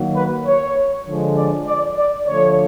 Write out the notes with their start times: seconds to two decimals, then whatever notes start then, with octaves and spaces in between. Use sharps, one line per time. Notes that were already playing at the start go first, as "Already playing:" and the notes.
Already playing: D#3 F#3 A#3
0.16 B4
0.46 C#5
1.07 D3 F3 G#3
1.37 D5
1.67 D5
1.98 D5
2.28 D3 F3 A3 C#5